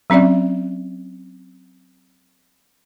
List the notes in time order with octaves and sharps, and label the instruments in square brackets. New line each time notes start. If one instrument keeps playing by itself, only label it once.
[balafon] F#3 C4 C#4 D5 E5